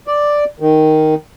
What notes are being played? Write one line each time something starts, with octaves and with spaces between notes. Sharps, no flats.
D5
D#3